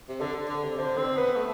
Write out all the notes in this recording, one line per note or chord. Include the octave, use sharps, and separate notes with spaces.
C3
D3 A4
D3
C3
D3 C5
C4 C5
B3 B4
A3